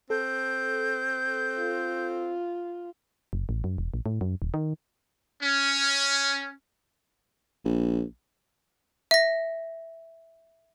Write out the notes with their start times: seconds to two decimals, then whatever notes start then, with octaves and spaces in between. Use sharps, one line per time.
0.10 C4 A4 G6
1.58 F4
3.33 F#1
3.49 A1
3.64 F#2
3.78 E1
3.94 A#1
4.06 A2
4.21 F#2
4.42 D#1
4.54 D#3
5.43 C#4
7.65 A#1
9.11 E5 A#6